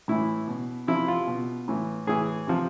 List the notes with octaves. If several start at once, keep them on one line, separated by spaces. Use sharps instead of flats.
A2 E3 E4
B2
C3 F3 E4
F4
B2
A2 E3
A2 E3 G#4
C3 F3